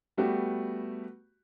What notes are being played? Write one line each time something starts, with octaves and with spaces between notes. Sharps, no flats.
G3 A3 B3 F#4 G4